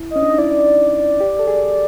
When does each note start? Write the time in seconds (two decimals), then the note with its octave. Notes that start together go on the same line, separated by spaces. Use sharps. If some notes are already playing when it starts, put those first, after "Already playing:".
Already playing: E4
0.11 D#5
0.16 C#4
0.23 D4
0.30 D#4
0.38 E4 D5
1.21 G4
1.39 A4
1.48 G#4